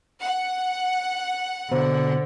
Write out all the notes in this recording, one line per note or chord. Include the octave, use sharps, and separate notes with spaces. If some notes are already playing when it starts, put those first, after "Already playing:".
F#5
B2 D3 C5